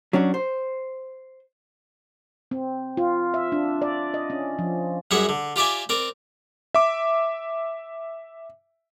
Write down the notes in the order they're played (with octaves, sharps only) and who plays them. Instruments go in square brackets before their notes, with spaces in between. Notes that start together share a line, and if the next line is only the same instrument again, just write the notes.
[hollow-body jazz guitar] F#3 C#4 D4 F#4
C5
[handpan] C4
F4
E5
D4
D5
D#5
C#4
F3
[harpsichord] F#2 G3 G#4 E5 F#5
D3
F4 G4 D5 E5 G#5
C4 A#4 D5
[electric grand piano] E5 D6